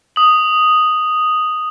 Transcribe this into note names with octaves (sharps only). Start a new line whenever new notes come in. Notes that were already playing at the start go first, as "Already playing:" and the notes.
D#6 F#7